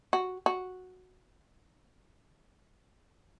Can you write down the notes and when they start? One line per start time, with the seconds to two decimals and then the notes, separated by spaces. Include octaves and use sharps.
0.13 F#4
0.46 F#4